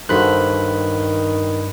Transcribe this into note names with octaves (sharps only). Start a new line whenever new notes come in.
G2 D#3 F#4 A4 C5 B5 F#6